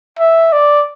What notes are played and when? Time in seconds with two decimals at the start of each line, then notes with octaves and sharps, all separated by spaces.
0.19 E5
0.52 D5